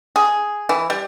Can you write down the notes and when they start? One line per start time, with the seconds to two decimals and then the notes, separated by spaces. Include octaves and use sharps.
0.16 G#4
0.69 E3
0.90 G3